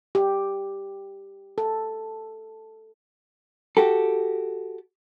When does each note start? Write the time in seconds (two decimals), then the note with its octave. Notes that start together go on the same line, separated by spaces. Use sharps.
0.15 G4
1.58 A4
3.77 F#4 G4 A4